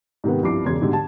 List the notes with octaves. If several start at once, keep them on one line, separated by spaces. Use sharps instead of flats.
G#2 C3 D#3 B3
C2 G2 F3 E4 D6 C7
E1 C#3 C6 G#6
G#2 B2 D3 G3
A5